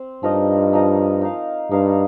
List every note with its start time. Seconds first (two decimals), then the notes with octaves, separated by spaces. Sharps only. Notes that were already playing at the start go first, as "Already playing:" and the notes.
Already playing: C4
0.23 G2 F3 D#4 A#4 D#5
0.73 F3 D#4 A#4 D#5
1.22 D#4 A#4 F5
1.71 G2 D#4 A#4 F5